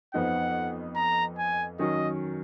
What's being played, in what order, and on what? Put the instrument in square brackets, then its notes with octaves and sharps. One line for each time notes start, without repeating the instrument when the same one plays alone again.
[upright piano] F2 F3 B3 D#4 [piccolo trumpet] F#5
[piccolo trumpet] A#5
G#5
[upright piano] D#3 F#3 C#4 [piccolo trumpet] D#5